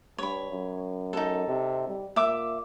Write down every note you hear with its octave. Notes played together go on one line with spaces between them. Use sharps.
G2 C#5 B5
F#2
D#4 A4
C3
G3
A#2 E5 D6